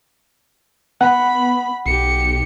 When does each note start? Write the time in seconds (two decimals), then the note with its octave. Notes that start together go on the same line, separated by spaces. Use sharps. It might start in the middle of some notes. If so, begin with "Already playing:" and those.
1.01 B3 F#5 B5
1.86 B1 G4 C#7